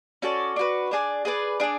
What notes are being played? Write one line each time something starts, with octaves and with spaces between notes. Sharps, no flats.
C#4 F#4 A4 D5
D4 F#4 B4
D4 G#4 D5
G#4 B4 D5
D4 G#4 D5